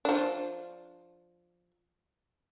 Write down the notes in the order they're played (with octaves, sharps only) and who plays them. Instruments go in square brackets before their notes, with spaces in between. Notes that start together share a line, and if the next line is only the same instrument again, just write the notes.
[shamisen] F3 D4